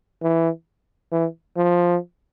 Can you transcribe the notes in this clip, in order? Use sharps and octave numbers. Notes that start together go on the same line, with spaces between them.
E3
E3
F3